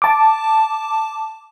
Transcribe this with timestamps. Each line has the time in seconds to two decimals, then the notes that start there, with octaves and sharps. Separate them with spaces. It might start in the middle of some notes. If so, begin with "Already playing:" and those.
0.02 A5 D6